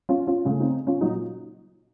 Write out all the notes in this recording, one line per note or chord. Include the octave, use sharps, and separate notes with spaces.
C#4 F4
C#4 F4
C#3 A3 C#4
C4 D#4
C#4 F4
A#2 F#3 D#4 F#4